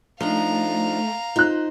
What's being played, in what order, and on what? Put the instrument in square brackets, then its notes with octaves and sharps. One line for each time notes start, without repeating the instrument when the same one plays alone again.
[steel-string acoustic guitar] F3 D4 D#4 [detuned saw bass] A3 [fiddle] F5 A#5
[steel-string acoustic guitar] D#4 C5 [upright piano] F4 F#6